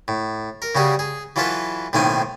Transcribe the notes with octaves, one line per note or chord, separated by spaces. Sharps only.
A2
A#4
C#3 G3 F#4 G#4
G#4
E3 F#3 F4 A4 B4
B1 A2 D#3 A#3 C4 G#5